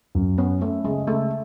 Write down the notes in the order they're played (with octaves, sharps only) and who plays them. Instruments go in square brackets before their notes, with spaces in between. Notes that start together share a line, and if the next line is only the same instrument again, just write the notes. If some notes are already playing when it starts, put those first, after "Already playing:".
[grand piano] F#2
[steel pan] B3 [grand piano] C#4
[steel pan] A3 [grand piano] C#4
[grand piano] C#3 [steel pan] G#3
[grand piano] C#3 [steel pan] A3